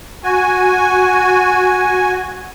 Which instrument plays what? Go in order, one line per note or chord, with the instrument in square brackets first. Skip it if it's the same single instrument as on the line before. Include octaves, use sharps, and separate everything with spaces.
[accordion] F#4 G#5